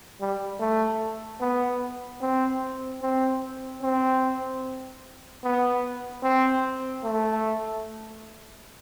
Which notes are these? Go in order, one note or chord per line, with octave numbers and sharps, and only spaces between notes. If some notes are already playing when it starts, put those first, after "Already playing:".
G3
A3
B3
C4
C4
C4
B3
C4
A3